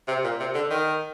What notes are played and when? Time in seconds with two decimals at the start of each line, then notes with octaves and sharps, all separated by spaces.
0.08 C3
0.24 A#2
0.40 C3
0.55 D3
0.71 D#3